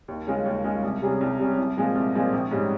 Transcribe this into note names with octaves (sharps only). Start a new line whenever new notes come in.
D#2
C#3 G#3 C#4 F4
D#2
C#3 G#3 C#4 F4
C2
C3 G3 C#4 G#4
C2
C3 G3 C#4 G#4
C2
A#2 F3 G#3 C4
C2
A#2 F3 G#3 C4
A#1
G#2 G3 C#4